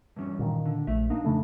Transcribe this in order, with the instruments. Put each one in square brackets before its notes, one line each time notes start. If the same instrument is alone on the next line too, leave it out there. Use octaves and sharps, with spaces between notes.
[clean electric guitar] G2 E3 C#4
[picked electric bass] A#2 D#3
[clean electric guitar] D3
[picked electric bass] A#1 [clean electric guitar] A3 E5
[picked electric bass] A#3 [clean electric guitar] D4 D#4
[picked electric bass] F2 C#3 A3